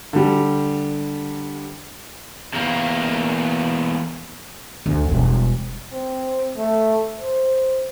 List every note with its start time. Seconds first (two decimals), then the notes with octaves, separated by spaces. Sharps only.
0.13 D3 G3
2.53 E2 A#3
4.86 D2
5.09 E1 G3
5.92 C4
6.57 A3
7.19 C5